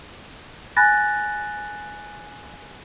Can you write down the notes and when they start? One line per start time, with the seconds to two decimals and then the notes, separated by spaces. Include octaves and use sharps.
0.77 G#5 B5 F#6 A6 A#6